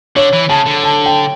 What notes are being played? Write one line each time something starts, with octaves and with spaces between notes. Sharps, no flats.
D3 C#5
E3
C#3 A5
D3
A5
G5